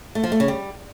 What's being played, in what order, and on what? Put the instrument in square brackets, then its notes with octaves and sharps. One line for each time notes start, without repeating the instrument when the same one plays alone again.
[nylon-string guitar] A3
F3
A3
C#3
G3